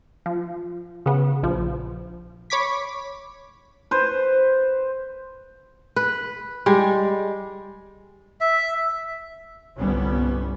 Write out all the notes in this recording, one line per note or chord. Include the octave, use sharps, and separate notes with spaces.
F3
C#3 B3
A#1 F3
C#5 B5 D6 G#6 B6
B4 C5
B4
G3 G#3
E5
G1 C2 G3 B3 C#4